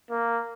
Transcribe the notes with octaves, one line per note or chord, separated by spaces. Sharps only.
A#3